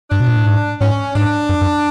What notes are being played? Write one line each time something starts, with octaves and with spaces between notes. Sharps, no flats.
G2 D4
B2
A#2
A2
G#2
G#2 C#4
G#2 D4
F#2
F#2